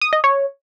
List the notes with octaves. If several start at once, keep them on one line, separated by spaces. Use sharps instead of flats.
D#6
D#5
C#5